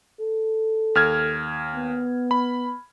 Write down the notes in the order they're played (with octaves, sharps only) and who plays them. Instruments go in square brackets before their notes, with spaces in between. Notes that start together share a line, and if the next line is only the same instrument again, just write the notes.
[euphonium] A4
[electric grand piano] D#2 F6 G#6
[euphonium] B3
[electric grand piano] B5